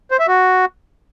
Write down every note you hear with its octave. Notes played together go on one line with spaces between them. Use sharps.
C5
E5
F#4